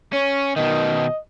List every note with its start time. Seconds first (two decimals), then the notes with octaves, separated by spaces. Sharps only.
0.13 C#4 C#5
0.56 B2 D#3 D#5